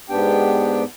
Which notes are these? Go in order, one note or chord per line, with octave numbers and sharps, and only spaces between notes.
G#2 B3 D4 G4 G5